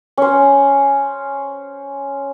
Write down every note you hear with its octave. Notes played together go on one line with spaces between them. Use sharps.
C#4 C5